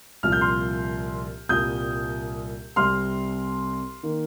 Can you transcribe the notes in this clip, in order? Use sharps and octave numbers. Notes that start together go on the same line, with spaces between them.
C2 A#2 F3 F6
G6
C6 F6
C2 A#2 G3 D#6 G6
C2 C3 G3 C4 C6 F6
D#3 A#3